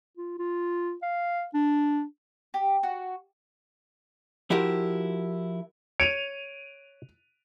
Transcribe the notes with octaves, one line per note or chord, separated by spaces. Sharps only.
F4
F4
F5
D4
G4
F#4
F3 E4 F#4 G4 A#4
C#5 D7 D#7 F7